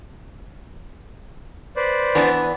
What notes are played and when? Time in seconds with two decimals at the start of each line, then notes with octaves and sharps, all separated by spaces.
1.76 B4 C5 D5
2.15 E3 B3 D4